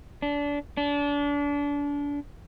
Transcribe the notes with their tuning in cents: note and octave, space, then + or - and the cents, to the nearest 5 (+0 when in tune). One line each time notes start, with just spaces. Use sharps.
D4 -25
D4 -30